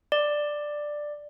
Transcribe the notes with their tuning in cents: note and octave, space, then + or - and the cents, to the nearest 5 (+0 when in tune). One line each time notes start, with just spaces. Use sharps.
D5 +10